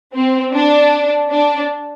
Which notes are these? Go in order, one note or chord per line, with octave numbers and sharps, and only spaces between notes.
C4
D4
D4